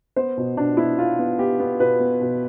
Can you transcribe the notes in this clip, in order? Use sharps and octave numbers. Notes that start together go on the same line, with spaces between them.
B3 C5
B2
B2 D4
B3 E4
B3 F4
B3
B3 G4
B3
B2 B4
B3
B2